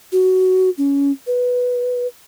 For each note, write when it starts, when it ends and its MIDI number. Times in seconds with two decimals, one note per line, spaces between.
0.12 0.70 66
0.78 1.11 61
1.27 2.07 71